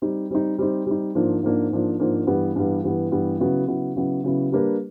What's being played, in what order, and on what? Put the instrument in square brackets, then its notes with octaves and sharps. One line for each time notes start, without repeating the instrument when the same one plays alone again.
[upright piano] G3 C4 D#4
G3 C4 D#4
G3 C4 D#4
G3 C4 D#4
G#2 F3 A#3 D4
G#2 F3 A#3 D4
G#2 F3 A#3 D4
G#2 F3 A#3 D4
G2 E3 G3 B3
G2 E3 G3 B3
G2 E3 G3 B3
G2 E3 G3 B3
C#3 F#3 B3 E4
C#3 F#3 B3 E4
C#3 F#3 B3 E4
C#3 F#3 B3 E4
G3 A#3 D4 G4 B4